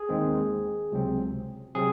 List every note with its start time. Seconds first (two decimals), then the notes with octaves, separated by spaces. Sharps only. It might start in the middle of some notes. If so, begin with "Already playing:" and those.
Already playing: G#4
0.09 D#2 D#3 G#3 C4
0.92 C#2 C3 F#3 C4
1.75 C3 F#3 C4 G#4